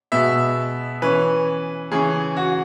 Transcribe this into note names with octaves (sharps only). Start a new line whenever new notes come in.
B2 G#3 B3 E5
E3 C#4 B4
C#3 E3 C#4 G#4
F#4